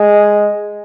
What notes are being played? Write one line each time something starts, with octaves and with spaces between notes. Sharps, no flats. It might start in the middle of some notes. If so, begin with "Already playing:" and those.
Already playing: G#3